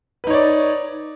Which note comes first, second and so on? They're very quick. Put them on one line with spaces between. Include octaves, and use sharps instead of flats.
B4 D#4 C#5 D5